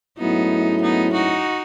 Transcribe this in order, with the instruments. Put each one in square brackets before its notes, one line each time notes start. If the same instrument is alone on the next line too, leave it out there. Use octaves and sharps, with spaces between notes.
[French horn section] G#2 F#3 A3 C#4 E4 [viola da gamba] B3 D#4
[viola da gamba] B3 D#4
D#4 F#4